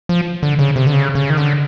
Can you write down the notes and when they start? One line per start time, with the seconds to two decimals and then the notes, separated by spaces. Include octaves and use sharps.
0.09 F3
0.43 D3
0.59 C#3
0.76 C3
0.87 D3
0.93 C#3
1.15 C#3
1.30 D#3
1.37 D3